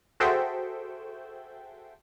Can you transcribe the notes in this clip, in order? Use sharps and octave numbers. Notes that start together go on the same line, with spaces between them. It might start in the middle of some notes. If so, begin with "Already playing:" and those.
F#4 G#4 A4 C5 E5 G5